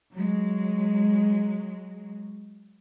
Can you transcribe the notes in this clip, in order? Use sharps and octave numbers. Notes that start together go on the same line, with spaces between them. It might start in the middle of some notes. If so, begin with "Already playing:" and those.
F#3 G#3